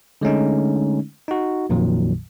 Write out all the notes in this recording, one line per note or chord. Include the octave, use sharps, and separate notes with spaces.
D3 G#3 A3 C#4 D#4
D#4 F#4
A#1 F2 A#2 D#3 F#3